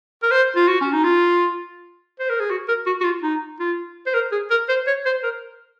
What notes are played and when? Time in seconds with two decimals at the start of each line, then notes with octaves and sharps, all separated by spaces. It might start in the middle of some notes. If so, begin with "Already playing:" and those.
0.23 A#4
0.31 C5
0.56 F4
0.68 F#4
0.81 C#4
0.93 D#4
1.04 F4
2.20 C5
2.30 A#4
2.40 G#4
2.50 F#4
2.68 A#4
2.86 F#4
3.01 F#4
3.04 F4
3.23 D#4
3.60 F4
4.07 C5
4.14 A#4
4.32 G#4
4.51 A#4
4.69 C5
4.87 C#5
5.06 C5
5.23 A#4